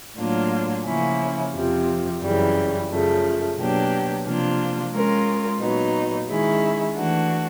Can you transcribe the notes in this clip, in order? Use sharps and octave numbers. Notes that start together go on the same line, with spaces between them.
A2 F#3 A#3 D4 F4
C#3 F3 A#3 C#4 E4
F2 C3 F3
F#2 C#3 E3 G3
F#2 C#3 F3 A3
B2 F#3 A#3 D4 G4
C3 F3 A#3 D4 F4
G#3 C#4 F4 A#4
A#2 F#3 B3 D#4
D#3 G#3 C#4 E4
E3 A3 D4 F#4